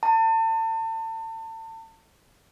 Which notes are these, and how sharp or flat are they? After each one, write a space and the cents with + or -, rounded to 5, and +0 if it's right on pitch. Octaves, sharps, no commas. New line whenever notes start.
A5 +35